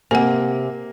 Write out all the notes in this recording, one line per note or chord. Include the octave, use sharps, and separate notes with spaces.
C3 A#3 F#5 G#5